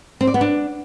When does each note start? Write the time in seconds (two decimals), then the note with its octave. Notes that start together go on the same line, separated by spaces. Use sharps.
0.21 C4
0.27 D5
0.34 B3
0.41 D4